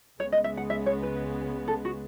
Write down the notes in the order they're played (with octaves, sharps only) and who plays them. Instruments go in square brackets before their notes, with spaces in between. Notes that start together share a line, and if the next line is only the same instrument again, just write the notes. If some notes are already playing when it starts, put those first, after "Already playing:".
[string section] C#2 C#3 G#3 B3 [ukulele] C#5
[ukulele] D#5
E5
F#5
E5
C#5
B4
A4
F#4